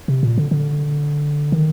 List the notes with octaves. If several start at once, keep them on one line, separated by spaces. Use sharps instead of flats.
C3
A#2
D3
D3
D#3